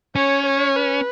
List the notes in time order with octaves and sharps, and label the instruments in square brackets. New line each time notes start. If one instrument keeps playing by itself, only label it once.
[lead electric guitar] C#4 [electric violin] C#5
[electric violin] C#5
B4